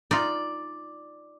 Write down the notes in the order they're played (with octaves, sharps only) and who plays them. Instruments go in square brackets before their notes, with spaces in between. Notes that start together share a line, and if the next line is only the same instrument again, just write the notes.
[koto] D#4 F4 [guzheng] D5